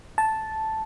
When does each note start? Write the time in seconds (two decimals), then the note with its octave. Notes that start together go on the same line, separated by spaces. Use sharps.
0.18 A5